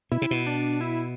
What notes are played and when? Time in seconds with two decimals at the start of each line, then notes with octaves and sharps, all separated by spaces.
0.12 B2 E4
0.22 C3
0.31 B2
0.46 D4
0.81 E4